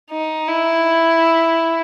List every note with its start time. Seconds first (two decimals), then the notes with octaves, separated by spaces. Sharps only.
0.11 D#4
0.48 E4